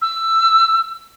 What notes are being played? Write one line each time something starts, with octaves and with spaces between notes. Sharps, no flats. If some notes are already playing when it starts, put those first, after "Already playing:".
E6